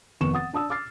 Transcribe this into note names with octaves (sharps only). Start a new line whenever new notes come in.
F1 D#3 B3 C#6 E7
F#5 D#6 A6
D4 A5 D#6 E6
D6 F6 A6 C7